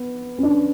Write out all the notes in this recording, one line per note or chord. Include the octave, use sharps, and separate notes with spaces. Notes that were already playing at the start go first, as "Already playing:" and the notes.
Already playing: B3
C#4
D4